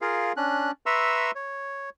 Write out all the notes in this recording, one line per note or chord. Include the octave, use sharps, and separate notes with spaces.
F4 G#4 A#4 F5
C#4 D4 F#6
B4 E5 A#5 C6 C#6 E6
C#5